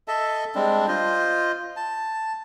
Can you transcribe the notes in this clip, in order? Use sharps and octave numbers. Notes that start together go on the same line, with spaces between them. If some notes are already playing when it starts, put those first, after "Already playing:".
A4 D#5 E5 A5
G3 G#3 C4 D4
F4 C5 D#5
A5